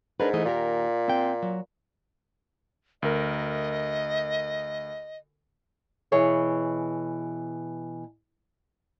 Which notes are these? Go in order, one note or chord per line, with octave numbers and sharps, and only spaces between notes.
G#2 D4 A#4 B4
E3 A3 D#5
D#2 A#2 G4 A#4
C4 G5
F#3
D2 A#4 D#5
B2 E3 G#4 C#5 E5